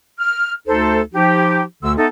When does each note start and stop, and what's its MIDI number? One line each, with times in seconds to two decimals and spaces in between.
0.19 0.53 89
0.66 1.00 38
0.66 1.00 63
0.66 1.00 69
0.66 1.00 72
1.13 1.62 53
1.13 1.62 63
1.13 1.62 67
1.83 1.93 38
1.83 1.93 50
1.83 1.93 88
1.97 2.06 57
1.97 2.06 59
1.97 2.06 63
1.97 2.06 69